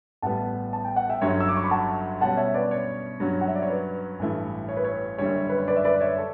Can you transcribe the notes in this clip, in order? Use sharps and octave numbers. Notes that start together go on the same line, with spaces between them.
A1 A2 G3 B3 F#5 A5
A5
G5
F#5
E5 G5
G1 G2 F#3 C#4 C#5
E6
D6
C#6
B5
F#5 A5
B2 G3 C#4 F#5 A5
C#5 E5
B4 D5
C#5
G2 F#3 C#4 F#4
F#5
E5
D5
C#5
B4
A1 G2 E3 A3 E4
C#5
B4
C#5
F#1 F#2 D3 G3 C#5
B4
C#5
B4 D5
E5
B4 D5
C#5 E5
A4